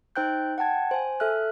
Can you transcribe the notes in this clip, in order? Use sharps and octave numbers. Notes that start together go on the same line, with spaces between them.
D#4 C5 G5 F#6 G6
F#5 G5 A5 G#6
C5 G#5
A4 E5 F6 F#6